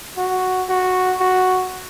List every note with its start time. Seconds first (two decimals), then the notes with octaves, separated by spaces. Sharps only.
0.17 F#4
0.69 F#4
1.20 F#4